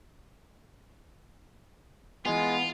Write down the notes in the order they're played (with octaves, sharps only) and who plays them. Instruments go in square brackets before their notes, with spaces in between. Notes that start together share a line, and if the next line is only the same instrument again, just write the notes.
[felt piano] E3 G#5 [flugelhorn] G#3 [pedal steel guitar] B3 [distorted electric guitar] F4